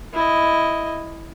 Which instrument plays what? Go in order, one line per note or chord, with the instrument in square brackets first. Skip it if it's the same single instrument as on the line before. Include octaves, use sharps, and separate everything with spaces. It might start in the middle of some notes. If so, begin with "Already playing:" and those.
[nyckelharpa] E4 D#5